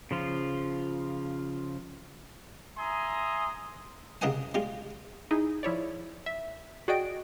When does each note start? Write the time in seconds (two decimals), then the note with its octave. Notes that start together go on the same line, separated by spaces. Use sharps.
0.11 C#3 F3 F4
2.78 E5 G#5 A#5 C6 D#6
4.21 C2 C#3 A#4 D#5 F#5 G#5
4.54 G3 G#3 F4
5.31 D#4 E4 G#4
5.63 F3 E4 C#5 D5
6.26 E5
6.88 F#4 G#4 D5 D#5 G5 D7